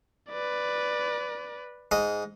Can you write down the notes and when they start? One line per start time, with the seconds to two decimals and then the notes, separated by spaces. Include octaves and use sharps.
0.29 B4 D5
1.91 G#2 D#5